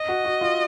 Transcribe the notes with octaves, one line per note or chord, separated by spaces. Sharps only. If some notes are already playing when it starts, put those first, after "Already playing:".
Already playing: D#5
F#4
F#4
F4